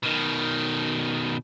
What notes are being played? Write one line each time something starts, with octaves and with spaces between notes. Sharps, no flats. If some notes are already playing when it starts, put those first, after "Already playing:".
B2 D#3